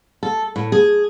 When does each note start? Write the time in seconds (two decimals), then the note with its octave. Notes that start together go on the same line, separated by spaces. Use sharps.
0.23 A4
0.56 A2
0.72 G#4